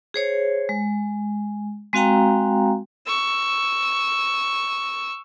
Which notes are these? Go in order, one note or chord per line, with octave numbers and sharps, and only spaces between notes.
G#4 C5 C#5
G#3
G#3 C4 F#4 F5 G5 A#5
C#6 E6